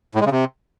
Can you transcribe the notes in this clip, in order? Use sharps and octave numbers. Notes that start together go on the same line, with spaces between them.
A2
G#3
C#3
C3